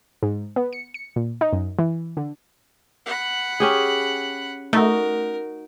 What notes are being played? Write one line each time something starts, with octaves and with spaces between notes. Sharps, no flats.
G#2
B3
C#7
C#7
A#2
D#4
F#2
E3
D3
F#5 B5
C#4 G4 G#4
A3 D#4 F#4 A#4